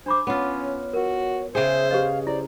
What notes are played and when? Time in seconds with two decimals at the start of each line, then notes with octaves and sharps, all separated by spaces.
0.06 D4 C5 B5 D6
0.27 B3 C#4 F4 C#5
0.93 F#4 A#4
1.55 C#3 G#4 C5 E5 G5
1.91 G4 B4 D#5 F5
2.27 E4 C5 D5